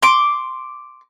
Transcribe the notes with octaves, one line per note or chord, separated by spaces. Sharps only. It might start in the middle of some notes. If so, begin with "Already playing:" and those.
C6 D6